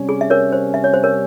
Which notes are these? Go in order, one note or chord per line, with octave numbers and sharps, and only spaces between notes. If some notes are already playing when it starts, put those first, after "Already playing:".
Already playing: C3 G3 C#4
G#4
E5
A#4 C#5
C5
E5
C#5
C5
A#4 C#5